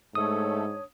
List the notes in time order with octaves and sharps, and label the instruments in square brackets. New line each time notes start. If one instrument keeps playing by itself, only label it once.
[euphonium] G#2 [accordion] A3 A4 [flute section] D4 C#5 [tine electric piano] D#6